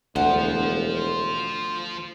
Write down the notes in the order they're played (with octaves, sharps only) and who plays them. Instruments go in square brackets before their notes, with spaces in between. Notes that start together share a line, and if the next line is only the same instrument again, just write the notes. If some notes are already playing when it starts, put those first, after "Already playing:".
[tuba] E1 [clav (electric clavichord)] D2 [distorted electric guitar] F4 C5 [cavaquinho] F#5